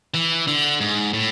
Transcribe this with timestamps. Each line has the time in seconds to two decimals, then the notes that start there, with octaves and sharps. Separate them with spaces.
0.14 E3
0.47 D3
0.80 G#2
1.13 A2